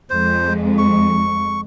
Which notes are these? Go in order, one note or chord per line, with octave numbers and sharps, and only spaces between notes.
F2 G#3 C5
C#6